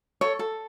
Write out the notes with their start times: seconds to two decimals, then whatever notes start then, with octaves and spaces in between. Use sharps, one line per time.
0.21 A4 C#5
0.39 A4